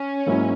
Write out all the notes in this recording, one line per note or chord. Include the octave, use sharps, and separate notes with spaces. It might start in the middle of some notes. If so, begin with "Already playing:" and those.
Already playing: C#4
G#2 F#3 A#3 E4